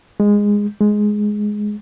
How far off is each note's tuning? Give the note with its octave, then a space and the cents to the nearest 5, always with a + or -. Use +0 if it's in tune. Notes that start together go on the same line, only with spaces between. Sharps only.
G#3 -15
G#3 +5